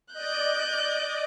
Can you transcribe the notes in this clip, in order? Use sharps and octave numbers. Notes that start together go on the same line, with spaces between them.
D5 D#5 F#6 G6